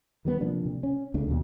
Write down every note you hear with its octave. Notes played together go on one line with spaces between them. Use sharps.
D#3 G3 B3
C3 F3 A#3 D4
C3
C#4
C#2 C#3 A3 D4
D#2 B2